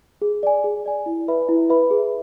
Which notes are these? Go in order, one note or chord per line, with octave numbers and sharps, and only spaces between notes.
G#4
D5 G#5
G#4
D5 G#5
E4
B4 E5 B5
E4
B4 E5 B5
G#4